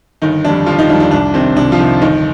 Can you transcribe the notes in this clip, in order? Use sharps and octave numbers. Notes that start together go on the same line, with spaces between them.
G1 D#3 D#4
F2 D#3 G3 D4
G1 F3 F4
D#3 D#4
F2 D#3 G3 D4
D4
C2 D4
C3 D#3 C4
C2 D4
F3 F4
C3 D#3
G1 D#3 D#4